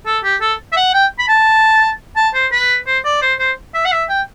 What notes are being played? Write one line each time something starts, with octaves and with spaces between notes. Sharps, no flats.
A4
G4
A4
E5
F#5
G5
B5
A5
A5
C5
B4
C5
D5
C5
C5
E5
F#5
E5
G5